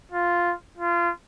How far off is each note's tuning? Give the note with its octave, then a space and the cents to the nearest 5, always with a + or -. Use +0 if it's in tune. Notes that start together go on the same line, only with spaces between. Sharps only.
F4 +0
F4 -25